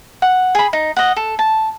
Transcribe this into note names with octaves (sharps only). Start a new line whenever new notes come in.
F#5
G#4 B5
D#4
D#5 F#5
A4
A5